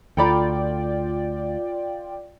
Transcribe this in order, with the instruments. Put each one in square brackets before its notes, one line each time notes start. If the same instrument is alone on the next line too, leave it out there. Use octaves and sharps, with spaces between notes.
[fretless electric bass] D2 [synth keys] F4 D5 G5 [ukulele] A4 A#5 B5